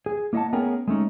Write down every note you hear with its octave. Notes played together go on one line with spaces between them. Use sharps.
G#4
A#3 E4 D#5 F5 F#5 A5
A3 B3 C#4 G#4 A#4 G5
G#3 A3 C#4 D#4